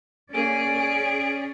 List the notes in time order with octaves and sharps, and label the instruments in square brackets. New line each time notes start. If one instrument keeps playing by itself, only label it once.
[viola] A#3 G#4 [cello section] C#4 D5 [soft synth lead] G#5 [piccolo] D7
[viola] G#4